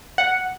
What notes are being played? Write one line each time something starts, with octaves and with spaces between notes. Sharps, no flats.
F#5